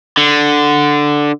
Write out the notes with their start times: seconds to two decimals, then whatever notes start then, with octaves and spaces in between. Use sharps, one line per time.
0.18 D3